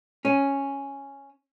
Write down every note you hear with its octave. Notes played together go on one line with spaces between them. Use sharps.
C#4